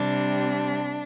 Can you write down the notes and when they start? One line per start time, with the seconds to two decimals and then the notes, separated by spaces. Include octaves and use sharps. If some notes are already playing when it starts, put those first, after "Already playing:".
Already playing: C3 G3 D4